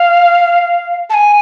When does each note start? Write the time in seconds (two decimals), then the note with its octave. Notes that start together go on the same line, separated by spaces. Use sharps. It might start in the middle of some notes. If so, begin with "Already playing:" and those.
Already playing: F5
1.10 A5
1.14 G#5